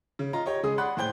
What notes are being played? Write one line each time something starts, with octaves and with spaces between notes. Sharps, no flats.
C#3
F4 D#5 A#5
G4 C#5 D#5
C#3 G#3 G#4 D#6
D5 F#5 B5 C6 F#6
A2 C5 G5 G6 G7